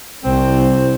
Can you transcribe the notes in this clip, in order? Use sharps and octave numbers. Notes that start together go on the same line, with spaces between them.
C2 C4